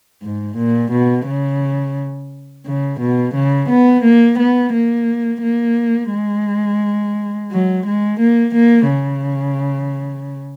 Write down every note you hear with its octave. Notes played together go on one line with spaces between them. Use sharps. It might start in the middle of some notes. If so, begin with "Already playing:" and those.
G#2
A#2
B2
C#3
C#3
B2
C#3
B3
A#3
B3
A#3
A#3
G#3
F#3
G#3
A#3
A#3
C#3